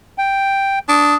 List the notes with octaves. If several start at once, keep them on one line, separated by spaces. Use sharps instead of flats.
G5
D4 D#6